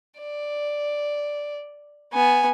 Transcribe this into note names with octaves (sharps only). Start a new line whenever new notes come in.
D5
B3 G#5